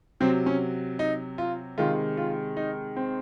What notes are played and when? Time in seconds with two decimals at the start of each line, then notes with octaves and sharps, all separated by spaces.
0.20 C3 F#3 C4
0.46 C#4
0.99 D#4
1.38 F4
1.78 C3 D#3 G#3 F4
2.17 F4
2.57 D#4
2.97 C4